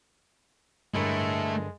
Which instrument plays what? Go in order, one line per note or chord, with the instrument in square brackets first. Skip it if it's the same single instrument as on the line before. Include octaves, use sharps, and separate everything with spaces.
[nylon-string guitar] G2 D3 A#4 [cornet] G#3 [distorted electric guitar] A3 E4